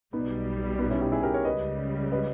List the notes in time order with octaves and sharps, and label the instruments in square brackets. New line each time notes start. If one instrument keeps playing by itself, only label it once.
[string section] B1 B2 G3 [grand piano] B3 D#4
[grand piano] B3 D#4
C#4 E4
D#4 G4
E4 G#4
G4 A#4
A#4 C#5
[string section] C#2 C#3 G3 [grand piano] B4 D#5
[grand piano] B4 D#5